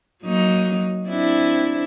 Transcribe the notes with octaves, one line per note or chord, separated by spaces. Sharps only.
F#3 A#3 D#4
C4 D4 E4